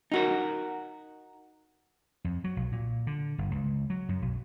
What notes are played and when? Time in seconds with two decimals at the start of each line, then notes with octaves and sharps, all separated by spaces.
0.12 D#4 F#4 A#4
2.24 F2
2.44 F#3
2.56 B1
2.72 A#2
3.07 D3
3.38 G1
3.51 C#2
3.90 F#3
4.09 F#2
4.22 B1